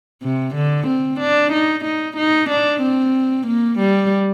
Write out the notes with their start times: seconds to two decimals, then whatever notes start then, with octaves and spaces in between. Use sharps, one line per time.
0.23 C3
0.55 D3
0.87 C4
1.20 D4
1.53 D#4
1.85 D#4
2.17 D#4
2.50 D4
2.82 C4
3.47 A#3
3.79 G3